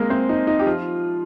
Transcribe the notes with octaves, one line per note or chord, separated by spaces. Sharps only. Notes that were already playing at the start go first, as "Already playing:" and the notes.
Already playing: G#3 A#3 C4 A#4
C4 C5
D#4
D#4
G4
F3 F4